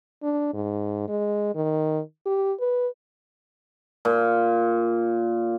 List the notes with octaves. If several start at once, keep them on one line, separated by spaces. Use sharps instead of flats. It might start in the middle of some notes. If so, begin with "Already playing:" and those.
D4
G#2
G#3
D#3
G4
B4
A#2